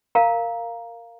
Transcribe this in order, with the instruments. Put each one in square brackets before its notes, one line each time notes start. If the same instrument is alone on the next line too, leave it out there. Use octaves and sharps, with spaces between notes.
[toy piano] A#4 F5 A#5